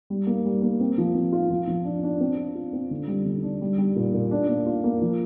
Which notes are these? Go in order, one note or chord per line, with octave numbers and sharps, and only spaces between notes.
G3
A#3
G3
A#3
C4
F3
C4
F4
F3
F3
D4
D4
C4
F4
F4
C4
D3
G3
D3
D4
G3
G3
A#2
A#2
D4
A#3
F4
A#3
F3